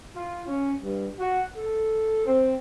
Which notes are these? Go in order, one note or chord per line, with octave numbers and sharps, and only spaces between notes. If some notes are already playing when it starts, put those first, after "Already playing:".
F4
C#4
G2
F#4
A4
C4